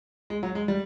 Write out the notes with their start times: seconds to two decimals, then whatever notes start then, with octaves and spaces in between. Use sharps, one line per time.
0.30 G#3
0.43 F#3
0.55 G#3
0.68 G3